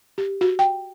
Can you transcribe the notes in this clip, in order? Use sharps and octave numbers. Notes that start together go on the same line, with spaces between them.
G4
F#4
G5